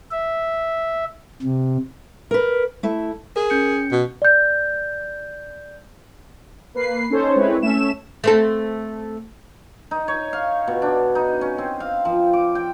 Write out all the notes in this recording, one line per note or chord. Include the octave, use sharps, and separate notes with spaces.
E5
C3
A#4 B4
A3 E4
G#4 A#4
C#4 G6 C#7
B2
D5 G6
A#3 B4 C7
C#4 D#4 A4 C5 C#5
G#3 C4 E4 B4 C#5
A3 C#4 E5 E7
A3 C4 A4
D#4
C#5
F5
B2
D4
D#4
C#4
C4
F5
F3
D6
G5